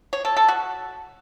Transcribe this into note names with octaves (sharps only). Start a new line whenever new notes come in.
C#5
A4
A4
F#4